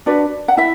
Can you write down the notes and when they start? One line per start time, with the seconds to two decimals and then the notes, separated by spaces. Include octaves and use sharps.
0.06 D4 F#4 B4 D5
0.48 F#5
0.57 E4 E5